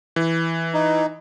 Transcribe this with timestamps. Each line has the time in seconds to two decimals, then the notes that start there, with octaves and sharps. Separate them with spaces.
0.16 E3
0.74 D#4